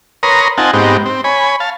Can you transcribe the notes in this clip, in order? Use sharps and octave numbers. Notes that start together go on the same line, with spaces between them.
A#4 B4 C#5 A#5 C6 D#6
C4 D#4 F4 F#5 G#5 A5
G#2 B3 C4 D#4 G4
C4
C#5 G#5 B5
F5 A5